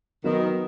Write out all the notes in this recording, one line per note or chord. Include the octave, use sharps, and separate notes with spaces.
D#3 F#3 B3